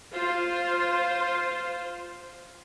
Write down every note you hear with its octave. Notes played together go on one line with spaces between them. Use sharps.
F4 C5